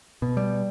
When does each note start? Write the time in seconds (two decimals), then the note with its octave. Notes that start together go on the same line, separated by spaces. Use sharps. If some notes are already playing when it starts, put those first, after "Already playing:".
0.22 B2
0.37 G3